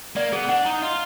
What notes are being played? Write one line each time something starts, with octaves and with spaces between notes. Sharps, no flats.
A#3 D5
B3 G#4
D4 F#5
D#4 A#5
F4 D#5